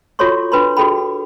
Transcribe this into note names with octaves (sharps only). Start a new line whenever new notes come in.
F4 F#4 A4 C#5 C6 C#6
D4 B4 B5 C6
F#4 G#4 A4 G5 B5